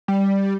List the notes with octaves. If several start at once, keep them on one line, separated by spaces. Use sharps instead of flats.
G3